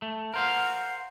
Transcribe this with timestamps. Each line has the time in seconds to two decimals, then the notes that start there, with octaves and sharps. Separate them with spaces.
0.02 A3
0.34 A#4 C5 F5 F#5